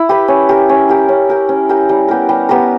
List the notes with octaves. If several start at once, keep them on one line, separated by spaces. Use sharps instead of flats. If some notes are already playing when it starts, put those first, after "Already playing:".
Already playing: E4
G4 B4
C#4
G4 A#4
C#4
G4 A#4
C#4
G4 A#4
C#4
G4 A#4
G3
B3 G4 A#4
G3
B3 G4 A#4